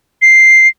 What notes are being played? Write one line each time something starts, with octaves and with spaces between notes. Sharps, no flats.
C7